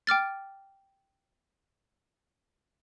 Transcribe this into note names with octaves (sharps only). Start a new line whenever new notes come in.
G5 D6 F6 A6